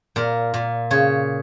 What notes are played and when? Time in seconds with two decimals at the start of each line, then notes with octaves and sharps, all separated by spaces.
0.16 A#2 A#4
0.54 A#2
0.91 C#3 C#5